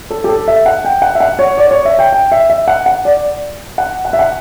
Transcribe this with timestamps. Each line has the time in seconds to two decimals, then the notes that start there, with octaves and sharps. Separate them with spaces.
0.10 A4
0.24 G4
0.29 A4
0.48 E5
0.66 F#5
0.85 G5
1.02 F#5
1.15 E5
1.20 F#5
1.39 C#5
1.57 D5
1.71 C#5
1.85 E5
1.99 G5
2.13 G5
2.32 E5
2.50 E5
2.68 F#5
2.86 F#5
3.05 D5
3.78 F#5
4.05 F#5
4.13 E5
4.19 F#5